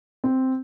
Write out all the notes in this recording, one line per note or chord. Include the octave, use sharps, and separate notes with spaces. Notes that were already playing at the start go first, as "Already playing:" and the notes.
C4